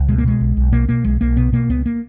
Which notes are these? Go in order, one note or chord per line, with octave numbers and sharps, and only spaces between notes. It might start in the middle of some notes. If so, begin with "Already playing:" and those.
Already playing: C#2
B2 G#3
A#3
B2 G#3
B1
B1
B2 A#3
B2 A#3
B1 G#3
B1 A#3
B2 B3
B2 A#3
C#2 B3
A#3